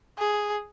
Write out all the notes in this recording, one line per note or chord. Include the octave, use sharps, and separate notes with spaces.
G#4